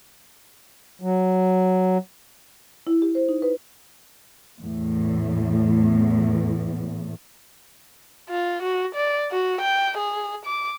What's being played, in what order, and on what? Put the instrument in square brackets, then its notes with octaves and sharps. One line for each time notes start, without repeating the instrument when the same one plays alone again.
[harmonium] F#3
[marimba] E4
G4
C5
D#4
B4
[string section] E2 A2
[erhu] F4
F#4
D5
F#4
G5
G#4
D6